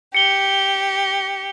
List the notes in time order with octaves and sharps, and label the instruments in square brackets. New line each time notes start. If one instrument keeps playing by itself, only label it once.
[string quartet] G4 [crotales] C#7 G7